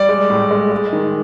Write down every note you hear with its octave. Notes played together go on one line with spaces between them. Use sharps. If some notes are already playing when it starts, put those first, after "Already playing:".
Already playing: G3 D5
G#3
A2
G#3
G#3
D#3